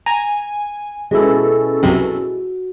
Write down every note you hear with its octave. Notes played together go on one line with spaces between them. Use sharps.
G#5 A#5
B2 G#3 C#4 E4 A4
C2 F#2 C3 F#4